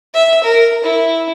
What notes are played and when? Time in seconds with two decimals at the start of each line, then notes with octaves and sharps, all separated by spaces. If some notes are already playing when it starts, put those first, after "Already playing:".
0.14 E5
0.44 A#4
0.84 E4